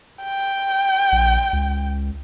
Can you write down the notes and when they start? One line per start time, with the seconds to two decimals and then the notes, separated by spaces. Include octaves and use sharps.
0.23 G5
1.12 A#1
1.53 C#2